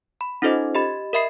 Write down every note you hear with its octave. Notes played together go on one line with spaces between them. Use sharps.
B5
C#4 D#4 F4 A4 C5 D#5
G4 D#5 B5 A6
A#4 D#5 E5 B5 C7